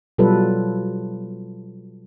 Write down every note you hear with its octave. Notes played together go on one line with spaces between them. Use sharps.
B2 F#3 G3 F4 A4 B4